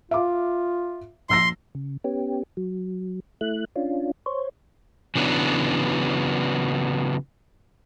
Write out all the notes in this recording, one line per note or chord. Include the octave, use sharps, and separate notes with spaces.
F4 E5 F5 D6
A#1 C6 E6 A#6
C#3
B3 C#4 G4
F#3
A3 E4 F#6
C#4 D4 F4
C5 C#5
C#3 E3 F#3 B3 D4